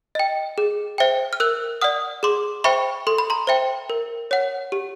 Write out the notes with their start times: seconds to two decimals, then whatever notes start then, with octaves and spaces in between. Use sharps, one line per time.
0.15 D#5 G5
0.58 G#4
0.98 C5 E5 G5
1.33 F6
1.40 A#4 E6 F#6
1.82 D5 F#5 D#6 F6
2.23 G#4 C6 D6
2.64 C5 E5 G5 B5 C#6
3.07 A4 C6
3.18 B5
3.30 A#5 C6
3.47 C5 E5 G5
3.90 A#4
4.31 C#5 F#5
4.72 G4